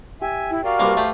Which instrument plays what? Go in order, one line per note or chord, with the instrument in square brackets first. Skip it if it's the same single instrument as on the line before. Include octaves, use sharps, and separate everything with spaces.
[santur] G4 [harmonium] E5 G#5
[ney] E4
[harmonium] F#4 A#4 D5 [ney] F5
[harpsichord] C2 A#3 D6 [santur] B4 C5
[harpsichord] A3 G4